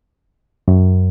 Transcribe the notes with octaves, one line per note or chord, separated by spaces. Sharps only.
F#2